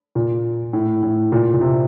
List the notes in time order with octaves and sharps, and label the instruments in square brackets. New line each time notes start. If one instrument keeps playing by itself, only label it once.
[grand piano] A#2
A2
A2
A#2
A#2
C3